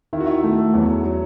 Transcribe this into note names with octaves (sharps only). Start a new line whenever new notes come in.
D#3 E4
F#4
E4
A3
E2 F#3
F#3